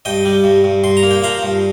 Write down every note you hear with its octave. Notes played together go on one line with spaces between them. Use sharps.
G2 D#5 G5
G3
G2
G2
G2 C6
A#5
A#3
G5
F3 F5 A#5
G2